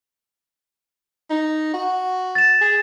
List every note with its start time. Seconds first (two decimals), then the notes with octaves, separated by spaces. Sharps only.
1.30 D#4
1.74 F#4
2.35 A6 E7
2.61 G#4